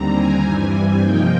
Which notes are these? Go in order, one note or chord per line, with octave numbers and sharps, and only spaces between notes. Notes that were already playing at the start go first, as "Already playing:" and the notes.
Already playing: D#2 D3 G3 C4 A#5
G#5
G2 E3 G3 C4
C3 F3 A#3 D#4 G5